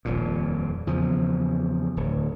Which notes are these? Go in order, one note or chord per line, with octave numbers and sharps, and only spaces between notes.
D#1 F2 A#2
E2 C#3 F3
D1